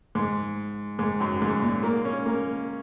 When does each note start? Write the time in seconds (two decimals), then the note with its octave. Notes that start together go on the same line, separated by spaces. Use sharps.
0.15 G#2
0.99 G#2
1.20 F#2
1.42 G#2
1.62 A#2
1.83 A#3
2.05 C#4
2.26 A#3